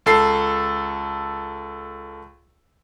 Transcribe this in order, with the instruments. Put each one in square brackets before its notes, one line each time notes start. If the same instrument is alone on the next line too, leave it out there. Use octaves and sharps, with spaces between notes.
[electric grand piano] C#2 A4 C7